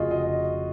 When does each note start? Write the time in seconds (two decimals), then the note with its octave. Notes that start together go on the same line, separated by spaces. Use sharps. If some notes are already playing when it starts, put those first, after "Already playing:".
Already playing: F1 F2 C#3 F4 F#4 G#4 D#5
0.11 D#5